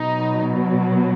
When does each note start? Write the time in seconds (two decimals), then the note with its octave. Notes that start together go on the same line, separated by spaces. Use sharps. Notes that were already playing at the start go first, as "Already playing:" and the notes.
Already playing: B2 F#3 D#4